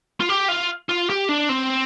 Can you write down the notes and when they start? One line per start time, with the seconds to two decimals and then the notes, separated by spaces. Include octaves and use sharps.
0.20 F4
0.29 G4
0.48 F4
0.89 F4
1.10 G4
1.29 D4
1.49 C4